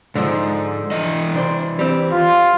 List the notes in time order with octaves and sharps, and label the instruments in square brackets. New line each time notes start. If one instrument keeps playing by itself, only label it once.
[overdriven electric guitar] G#2 [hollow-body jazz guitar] D3 F3
[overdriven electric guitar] E3 D#5
[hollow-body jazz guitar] C2 D4 C5
G3 C4
[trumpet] F4